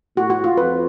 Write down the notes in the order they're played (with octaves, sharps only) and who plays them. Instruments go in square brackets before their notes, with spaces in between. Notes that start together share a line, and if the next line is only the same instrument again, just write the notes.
[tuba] A2 [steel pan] F#4
[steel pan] F#4
F4
[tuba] F2 [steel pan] B4